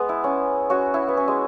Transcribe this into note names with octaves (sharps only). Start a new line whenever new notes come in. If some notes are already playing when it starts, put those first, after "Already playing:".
Already playing: G#3 B3 G#4
E4
C#4
C#4 F#4
E4
B3
C#4
G#3